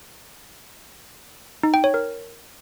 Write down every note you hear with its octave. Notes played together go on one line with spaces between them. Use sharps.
D#4
G5
C#5
A#4